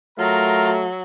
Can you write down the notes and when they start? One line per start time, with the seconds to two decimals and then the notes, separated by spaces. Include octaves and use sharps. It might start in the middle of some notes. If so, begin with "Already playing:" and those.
0.19 F#3 A3 F4 A#4 A#5